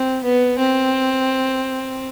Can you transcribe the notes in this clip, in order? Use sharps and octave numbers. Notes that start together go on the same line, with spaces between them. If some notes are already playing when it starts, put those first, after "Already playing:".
Already playing: C4
B3
C4